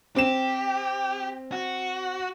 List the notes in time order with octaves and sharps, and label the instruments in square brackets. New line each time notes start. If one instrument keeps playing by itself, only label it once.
[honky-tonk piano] C4 E7 [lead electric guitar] G4
[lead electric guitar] F#4